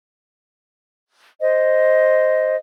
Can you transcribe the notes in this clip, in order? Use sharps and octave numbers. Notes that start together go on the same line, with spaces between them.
C5 D#5